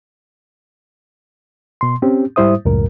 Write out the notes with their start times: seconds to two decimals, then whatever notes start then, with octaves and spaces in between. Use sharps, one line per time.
1.81 B2 C6
2.02 C4 C#4 G4
2.36 G#2 G3 E4 C5 E5 D#6
2.65 C#2 F#2 A2 A#4